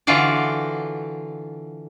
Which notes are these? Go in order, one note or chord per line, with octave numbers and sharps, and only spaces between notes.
D3 E3 F4 F#4 D5